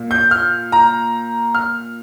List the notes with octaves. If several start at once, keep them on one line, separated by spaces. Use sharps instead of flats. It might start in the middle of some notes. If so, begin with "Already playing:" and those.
Already playing: A#2 A#3
G6
F6
A#5
F6